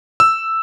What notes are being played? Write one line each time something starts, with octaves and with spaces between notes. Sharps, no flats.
E6